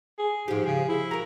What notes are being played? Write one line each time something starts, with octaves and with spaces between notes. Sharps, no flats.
G#4
G#2 F3 G4
C#3 G#4
E4
F#4 A#4 A#5